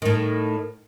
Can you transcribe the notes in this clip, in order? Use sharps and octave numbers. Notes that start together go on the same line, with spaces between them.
A2 D#3